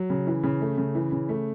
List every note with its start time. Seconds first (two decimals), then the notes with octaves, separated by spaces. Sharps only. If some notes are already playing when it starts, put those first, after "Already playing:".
Already playing: F#3
0.10 C#3
0.27 E3
0.44 C#3
0.61 A3
0.78 C#3
0.95 E3
1.12 C#3
1.29 A3